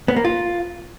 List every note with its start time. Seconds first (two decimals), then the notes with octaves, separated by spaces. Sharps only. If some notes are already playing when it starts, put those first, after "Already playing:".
0.08 B3
0.16 A#3
0.25 F4